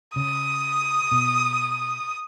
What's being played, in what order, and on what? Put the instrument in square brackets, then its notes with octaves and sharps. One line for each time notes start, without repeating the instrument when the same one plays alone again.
[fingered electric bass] C#3 [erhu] D#6
[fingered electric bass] B2